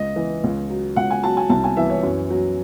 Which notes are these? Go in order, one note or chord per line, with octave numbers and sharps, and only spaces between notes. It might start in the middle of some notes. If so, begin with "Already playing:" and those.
Already playing: C#2 D#5
E3
C#2
F#3
C#2 F#5
G#5
F#3 A5
G#5
C2 A5
G#5
E3 E5
C#5
F#2
F#3